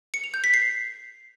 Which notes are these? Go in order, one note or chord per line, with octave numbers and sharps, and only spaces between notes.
C#7
F7
G6
B6
C7